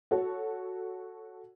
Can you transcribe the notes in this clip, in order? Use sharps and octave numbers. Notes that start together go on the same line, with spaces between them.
F#4 A4 C#5